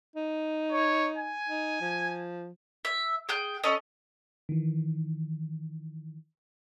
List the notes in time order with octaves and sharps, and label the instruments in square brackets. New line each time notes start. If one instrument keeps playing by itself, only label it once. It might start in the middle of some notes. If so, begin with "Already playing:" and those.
[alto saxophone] D#4
[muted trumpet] C#5
G#5
[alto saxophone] D#4
F3
[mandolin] E5
G#4 G5 F#6
C#4 A4 D#5
[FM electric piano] D#3 E3